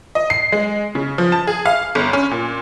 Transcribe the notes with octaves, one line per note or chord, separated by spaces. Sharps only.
D#5
C7
G#3
C#3
F3
A5
G#4
F5
G1
C#4
A#2